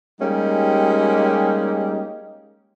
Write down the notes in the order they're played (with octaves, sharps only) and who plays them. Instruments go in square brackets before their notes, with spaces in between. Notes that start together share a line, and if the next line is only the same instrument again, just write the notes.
[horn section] G3 G#3 A#3 C#4 D#4 G4